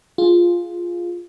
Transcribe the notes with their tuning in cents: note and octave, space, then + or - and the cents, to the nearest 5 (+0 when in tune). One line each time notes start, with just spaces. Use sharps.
F4 +0 G#4 +0